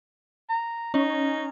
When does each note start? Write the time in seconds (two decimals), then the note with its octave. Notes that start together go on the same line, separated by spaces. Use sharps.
0.49 A#5
0.94 C#4 D#4